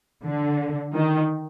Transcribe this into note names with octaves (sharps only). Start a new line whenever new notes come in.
D3
D#3